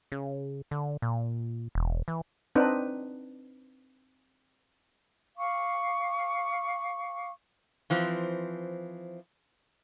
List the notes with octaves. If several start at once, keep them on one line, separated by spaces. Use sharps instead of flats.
C#3
D3
A#2
E1
E3
C4 D4 D#4 B4
F5 C#6 D6
E3 F3 C4